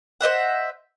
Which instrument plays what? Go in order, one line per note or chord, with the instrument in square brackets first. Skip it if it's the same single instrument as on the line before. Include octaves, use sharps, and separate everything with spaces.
[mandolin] C5 D#5 E5 F#5